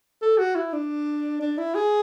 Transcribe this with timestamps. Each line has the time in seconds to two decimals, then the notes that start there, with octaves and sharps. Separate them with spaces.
0.22 A4
0.38 F#4
0.56 E4
0.73 D4
1.41 D4
1.58 E4
1.75 G#4